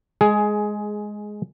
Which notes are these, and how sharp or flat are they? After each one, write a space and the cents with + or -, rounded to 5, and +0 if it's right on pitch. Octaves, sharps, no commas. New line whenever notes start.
G#3 +5 G#4 +15